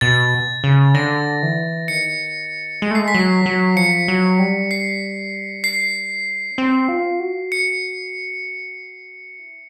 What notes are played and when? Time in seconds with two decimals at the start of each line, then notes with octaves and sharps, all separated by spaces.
0.01 B2 A6
0.64 C#3
0.94 D3 A#6
1.42 E3
1.88 D#3 C#7
2.82 G#3 C#7
2.91 A3
2.95 G#3 C7
3.08 B6
3.14 F#3 C7
3.46 F#3
3.76 F3 C#7
4.08 F#3
4.39 G3
4.71 C7
5.64 C7
6.51 C#4
6.58 C4
6.88 F4
7.20 F#4
7.52 C#7
9.39 E4